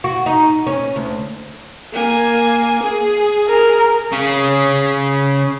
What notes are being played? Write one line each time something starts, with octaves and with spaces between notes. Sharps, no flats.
F#4
D#4
C#4
D2
A#3 G#5
G#4
A#4
C#3 C#4